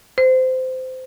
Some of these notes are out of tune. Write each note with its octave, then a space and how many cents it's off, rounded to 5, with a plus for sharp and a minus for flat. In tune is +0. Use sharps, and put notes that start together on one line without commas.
C5 -20